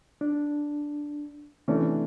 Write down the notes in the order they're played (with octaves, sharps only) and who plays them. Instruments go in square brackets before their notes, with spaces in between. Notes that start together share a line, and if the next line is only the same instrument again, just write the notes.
[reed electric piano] D4
[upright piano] C3 E3 A3 D4 [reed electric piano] C#4